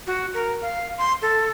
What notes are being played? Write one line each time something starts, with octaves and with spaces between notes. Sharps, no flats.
F#4
A#4
F5
C6
A4